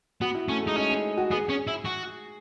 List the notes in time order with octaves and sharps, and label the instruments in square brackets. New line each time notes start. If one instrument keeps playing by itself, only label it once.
[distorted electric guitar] B3 [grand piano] F#4
[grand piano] E4
[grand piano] A3 [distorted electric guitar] C#4
[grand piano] G#3 [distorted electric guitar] D#4
[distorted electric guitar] C#4 [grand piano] D#4
[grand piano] G#4
F#4
[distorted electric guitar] B3 [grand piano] G#4
[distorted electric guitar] C#4
E4
F#4